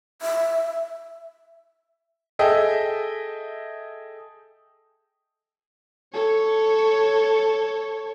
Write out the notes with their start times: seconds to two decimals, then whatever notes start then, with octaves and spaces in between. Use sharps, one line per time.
0.22 E5
2.39 G#4 A4 D#5 E5 G5
6.14 A4 C#5